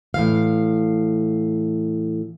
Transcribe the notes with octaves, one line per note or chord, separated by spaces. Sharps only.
A2 E3 F5